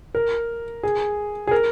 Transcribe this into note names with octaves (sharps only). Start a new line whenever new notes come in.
A#4
G#4
G#4
A#4